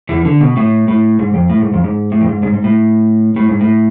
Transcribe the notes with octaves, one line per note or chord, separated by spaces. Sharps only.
E2 E3
D3
B2
A2
A2
G#2
F2
A2
G#2
F2
G#2
A2
F2
G#2
G#2
G#2
A2
A2
G#2
A2